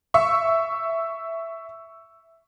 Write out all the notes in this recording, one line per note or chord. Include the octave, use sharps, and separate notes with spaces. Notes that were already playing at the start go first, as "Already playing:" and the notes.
E5 C#6 E6